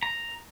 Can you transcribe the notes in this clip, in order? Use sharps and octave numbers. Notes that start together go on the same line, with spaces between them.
A#5